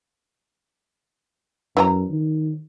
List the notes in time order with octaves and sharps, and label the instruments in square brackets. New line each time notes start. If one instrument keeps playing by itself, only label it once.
[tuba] F#2 [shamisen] E3 D#4 A#5
[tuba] D#3